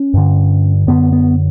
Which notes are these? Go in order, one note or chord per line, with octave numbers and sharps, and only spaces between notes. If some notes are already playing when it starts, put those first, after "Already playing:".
Already playing: C#4
G2 D3
F#2 D3 B3
B3